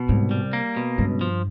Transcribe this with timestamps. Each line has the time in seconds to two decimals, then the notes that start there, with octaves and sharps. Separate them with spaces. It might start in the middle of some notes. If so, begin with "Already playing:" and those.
Already playing: B2
0.09 C2 G#2
0.31 G3
0.53 A#3
0.77 B2
0.98 C#2 G2
1.21 F3